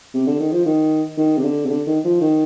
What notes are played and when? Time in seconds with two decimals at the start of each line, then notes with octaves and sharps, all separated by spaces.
0.14 C3
0.27 D3
0.40 D#3
0.52 F3
0.65 D#3
1.18 D#3
1.37 C3
1.44 D3
1.65 C3
1.70 D3
1.87 D#3
2.05 F3
2.21 D#3